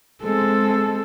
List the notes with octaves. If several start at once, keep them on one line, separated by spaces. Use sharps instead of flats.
G#3 C4 A4